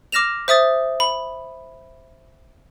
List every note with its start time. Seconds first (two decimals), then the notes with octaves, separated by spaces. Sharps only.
0.12 D6 F6 A#6 E7 F7
0.48 C5 E5 D#6 A6
1.00 B5